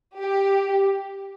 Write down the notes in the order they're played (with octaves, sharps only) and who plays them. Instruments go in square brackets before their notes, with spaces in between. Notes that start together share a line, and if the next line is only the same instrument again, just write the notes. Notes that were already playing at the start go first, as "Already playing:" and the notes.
[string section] G4